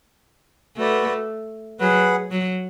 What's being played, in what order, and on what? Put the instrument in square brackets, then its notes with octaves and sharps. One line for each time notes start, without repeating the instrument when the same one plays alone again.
[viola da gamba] A3 [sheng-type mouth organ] F#4 B4 D5
[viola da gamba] F#3 [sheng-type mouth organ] G#4 B4 F#5
[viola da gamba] F#3